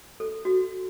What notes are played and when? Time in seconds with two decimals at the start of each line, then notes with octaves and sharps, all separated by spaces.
0.20 A4
0.45 F#4